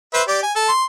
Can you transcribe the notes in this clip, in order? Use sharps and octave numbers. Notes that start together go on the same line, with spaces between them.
B4 C5 E5
G4 D5
G#5
A4
C6